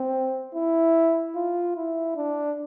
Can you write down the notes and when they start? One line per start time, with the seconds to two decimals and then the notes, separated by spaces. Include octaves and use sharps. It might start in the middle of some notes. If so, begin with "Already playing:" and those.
Already playing: C4
0.55 E4
1.36 F4
1.77 E4
2.16 D4